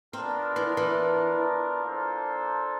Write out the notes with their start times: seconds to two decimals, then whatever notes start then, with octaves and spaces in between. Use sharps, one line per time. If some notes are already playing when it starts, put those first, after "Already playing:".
0.13 B3 C4 D4 F4 A#4
0.56 E3
0.77 E3
1.83 A#3 D4 F4 A4 C5